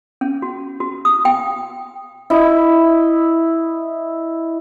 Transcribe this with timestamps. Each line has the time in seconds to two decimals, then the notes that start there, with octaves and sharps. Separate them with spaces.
0.21 C#4
0.42 F#4
0.80 F#4
1.05 D#6
1.25 G5
2.30 E4 D#5